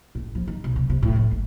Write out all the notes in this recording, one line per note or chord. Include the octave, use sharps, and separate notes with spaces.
A2
F3
D#3
B1
C3
C3
A2
F2
G#1